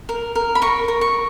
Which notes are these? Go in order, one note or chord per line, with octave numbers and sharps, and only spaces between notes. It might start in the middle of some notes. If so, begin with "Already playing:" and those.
A#4
A#4
B5
A#4 C#6
A#4
C#6